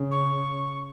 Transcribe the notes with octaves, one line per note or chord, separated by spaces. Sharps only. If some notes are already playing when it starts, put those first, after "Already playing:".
Already playing: C#3
C#6